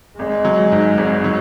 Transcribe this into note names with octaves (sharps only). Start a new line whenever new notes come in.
G#1 G#3
F#3
G#2
G#1
F#3